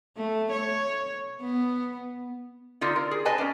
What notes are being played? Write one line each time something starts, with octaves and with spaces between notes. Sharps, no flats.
A3
C#5
B3
D3 D#4 F4
A#4
G#4
B4 D#5 G#5 A5
C#4 D4